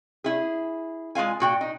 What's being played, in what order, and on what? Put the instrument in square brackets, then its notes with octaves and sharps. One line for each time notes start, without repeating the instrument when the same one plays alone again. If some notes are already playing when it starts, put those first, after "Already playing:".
[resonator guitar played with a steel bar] E4 G#4
G#3 F4 F5 G#5
A#2 F#4 G5
D#4